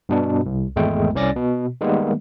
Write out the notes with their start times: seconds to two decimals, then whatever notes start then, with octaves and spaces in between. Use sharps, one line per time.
0.09 G2 B2 D4
0.46 C2
0.76 G#1 E2 G#3 A3 G5
1.15 C2 C#4 D5 A6 A#6
1.36 B2
1.81 D#3 G3 G#3 A#3 B3